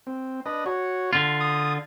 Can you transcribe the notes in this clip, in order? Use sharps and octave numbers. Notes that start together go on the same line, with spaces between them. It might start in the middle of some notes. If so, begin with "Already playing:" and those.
C4
D4 B4 D#5
F#4 C#5
D3 F4
D#6